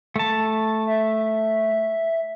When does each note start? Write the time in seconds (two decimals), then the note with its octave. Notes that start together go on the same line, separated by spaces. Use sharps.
0.16 A3 A5
0.87 E5